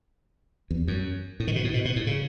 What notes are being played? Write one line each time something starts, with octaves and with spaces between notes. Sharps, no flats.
E2
F#2
A2
D#3
B2
A2
B2
B2
A2
C#3